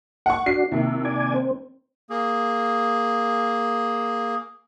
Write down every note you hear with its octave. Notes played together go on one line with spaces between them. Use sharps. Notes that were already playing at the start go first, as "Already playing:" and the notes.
F#5 C#6
D4 F#4 C7
D#2 C3 E4
D5 G#5
C4
A#3 G#4